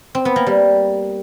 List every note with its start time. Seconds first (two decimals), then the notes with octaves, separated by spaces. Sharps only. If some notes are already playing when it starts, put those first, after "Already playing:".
0.15 C4
0.25 B3
0.36 A#3
0.47 G3